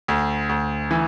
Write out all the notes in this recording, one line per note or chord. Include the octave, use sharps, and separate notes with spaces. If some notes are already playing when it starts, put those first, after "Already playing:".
D2
D2
E3